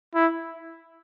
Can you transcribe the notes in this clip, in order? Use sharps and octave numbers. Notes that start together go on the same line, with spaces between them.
E4